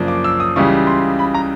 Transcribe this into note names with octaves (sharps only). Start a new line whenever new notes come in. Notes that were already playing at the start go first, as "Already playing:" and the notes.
Already playing: F#2 C#3 F3 A#3 D4
D6
E6
D#6
C#2 C#3 E3 G3 C#6
C6
B5
A#5